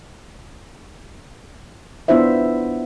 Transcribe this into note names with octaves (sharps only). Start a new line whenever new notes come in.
B3 D4 E4 F4 C5 E5